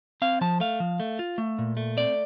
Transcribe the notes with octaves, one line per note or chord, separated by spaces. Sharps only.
C4 F5
F3 A5
A3 F5
F3
A3
F4
A3
A#2
A3
C4 D5